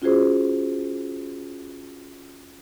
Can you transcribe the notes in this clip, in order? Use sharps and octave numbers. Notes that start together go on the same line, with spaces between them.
C#4 F4 F#4 G#4 C5